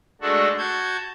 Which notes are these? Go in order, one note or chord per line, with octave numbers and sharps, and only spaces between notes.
G#3 A3 D4 F#4 A4
F#4 A5 G6 G#6